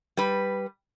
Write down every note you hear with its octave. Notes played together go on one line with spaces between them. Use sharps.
G3 B4